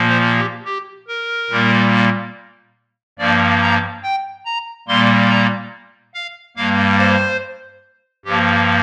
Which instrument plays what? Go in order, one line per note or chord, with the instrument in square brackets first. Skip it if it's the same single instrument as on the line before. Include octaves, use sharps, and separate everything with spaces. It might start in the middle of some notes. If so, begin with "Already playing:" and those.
Already playing: [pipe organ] A#2 F3 A#3
C5
G4
G4
A#4
A#2 G3 A#3
G2 F3 A#3 D5
A#5
G5
A#5
A#2 G3 A#3 C6
A#5
F5
G2 G3 A#3 F5
C5
G2 F3 A#3 G4